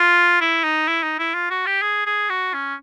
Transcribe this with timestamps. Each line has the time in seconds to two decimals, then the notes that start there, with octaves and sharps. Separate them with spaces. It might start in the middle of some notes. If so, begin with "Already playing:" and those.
Already playing: F4
0.41 E4
0.64 D#4
0.88 E4
1.03 D#4
1.19 E4
1.34 F4
1.50 F#4
1.66 G4
1.82 G#4
2.06 G#4
2.30 F#4
2.53 C#4